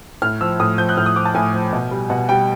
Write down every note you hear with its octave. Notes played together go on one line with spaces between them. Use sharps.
A2 F6
F3 E6
A2 D#6
F3 G6
F#6
A2 F6
D#6
F3 D6
A5
A2 G#5
F3
B2
G3
B2 F#5
G3 G5